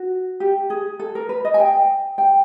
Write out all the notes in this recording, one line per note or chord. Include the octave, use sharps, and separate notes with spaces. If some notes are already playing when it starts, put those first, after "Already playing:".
Already playing: F#4
G4
G#4
A4
A#4
B4
D#5
G#5
G5
G5